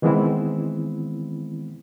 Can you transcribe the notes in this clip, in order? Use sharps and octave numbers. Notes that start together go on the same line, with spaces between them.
D#3 E3 G#3 B3 C4 E4